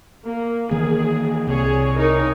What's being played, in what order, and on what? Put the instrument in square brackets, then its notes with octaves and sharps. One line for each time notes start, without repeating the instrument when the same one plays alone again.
[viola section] A#3
[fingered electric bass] D#3 E3 A#3 [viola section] G#4
[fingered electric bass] C2 C3 [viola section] G#4 C#5
[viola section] D#4 A#4 C#5